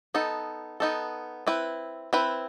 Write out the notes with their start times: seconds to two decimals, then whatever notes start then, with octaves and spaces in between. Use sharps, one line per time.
0.14 B3 D#4 A4
0.80 B3 D#4 A4
1.47 C4 E4 B4
2.13 C4 E4 B4